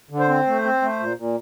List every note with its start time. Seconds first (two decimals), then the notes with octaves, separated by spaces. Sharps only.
0.10 D3
0.20 C5
0.28 C4
0.47 A3
0.64 C4
0.82 A3
1.00 A#2
1.17 A#2